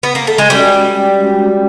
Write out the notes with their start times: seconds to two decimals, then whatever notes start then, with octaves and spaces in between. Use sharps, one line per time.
0.03 B3
0.15 A#3
0.27 A3
0.38 G#3
0.50 G3 G#3 C#4 F#4
1.22 G#3 C#4 F#4